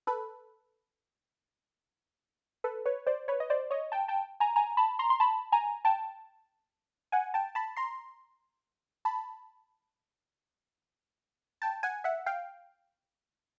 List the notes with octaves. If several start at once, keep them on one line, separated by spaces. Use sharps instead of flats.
A4 B4
A4 B4
B4 C#5
C5 D5
B4 C#5
D#5
C5 D5
C#5 D#5
G5 A5
G5 A5
G#5 A#5
G#5 A#5
A5 B5
A#5 C6
C6
A5 B5
G#5 A#5
G5 A5
F#5 G#5
G5 A5
A5 B5
A#5 C6
A5 B5
G5 A5
F#5 G#5
E5 F#5
F5 G5